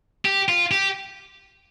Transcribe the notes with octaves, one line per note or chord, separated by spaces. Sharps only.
G4
F4
G4